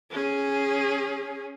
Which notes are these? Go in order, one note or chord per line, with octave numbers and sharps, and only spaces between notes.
C#4 G#4